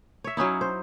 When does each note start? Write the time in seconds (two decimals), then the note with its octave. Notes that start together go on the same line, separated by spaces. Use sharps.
0.24 C#5 E5
0.37 F#3 C#4 D#4 E4
0.61 C5